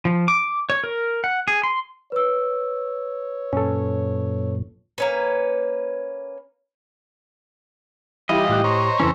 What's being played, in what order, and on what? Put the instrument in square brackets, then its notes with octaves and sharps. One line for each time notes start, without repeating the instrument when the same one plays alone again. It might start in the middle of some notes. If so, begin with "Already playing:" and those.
[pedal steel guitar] F3
D6
C#5
A#4
F#5
G#4
C6
[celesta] B4 E6 [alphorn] C#5
[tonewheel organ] F#2 A#2 [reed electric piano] C#4 A4
[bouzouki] A#3 C#4 B4
[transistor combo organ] E3 G3 F4 [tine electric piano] E4 G4 [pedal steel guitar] D#5
[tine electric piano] A2 G4 F#6
[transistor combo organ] C5 C#5 A#5
[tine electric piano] F2 C#3 E3 [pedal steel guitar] C#4 A4